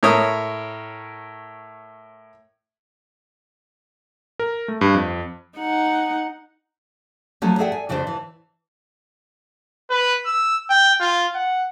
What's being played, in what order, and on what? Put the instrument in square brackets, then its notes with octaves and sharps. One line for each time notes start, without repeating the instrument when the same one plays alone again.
[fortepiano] A2 A#4 C#5 D#6
[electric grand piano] A#4
A3
G2
F2
[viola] D#4 F#5
[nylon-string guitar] F3 F#3 A3 C#4
G#4 A4 D5 E5 F#5 G5
G#5
F2 C#3 D4 G#4 B4 C5
E3
[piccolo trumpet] B4
E6
G5
F4
F#5